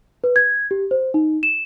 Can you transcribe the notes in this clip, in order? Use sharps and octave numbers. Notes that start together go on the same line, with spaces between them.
B4
G#6
G4
C5
D#4
E7